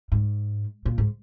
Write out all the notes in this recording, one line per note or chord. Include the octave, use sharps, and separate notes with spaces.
G#2
A#2
G#2